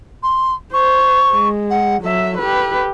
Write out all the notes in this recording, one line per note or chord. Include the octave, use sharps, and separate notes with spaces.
C6
C5 C#6
G#3
F#5
F#3 A4 E5
G4 B4